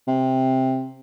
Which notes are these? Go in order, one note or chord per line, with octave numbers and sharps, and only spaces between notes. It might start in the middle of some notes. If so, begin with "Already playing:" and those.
C3